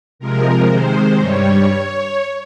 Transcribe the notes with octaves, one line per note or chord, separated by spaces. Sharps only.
C3 F3 G#3 A#4
C3 D#3 G#3 C5
G2 G3 C#5